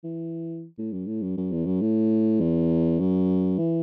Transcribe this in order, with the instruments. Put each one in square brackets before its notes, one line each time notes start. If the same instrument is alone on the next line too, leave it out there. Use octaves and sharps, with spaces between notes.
[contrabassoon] E3
A2
F#2
A2
F#2
F#2
E2
F#2
A2
E2
F#2
E3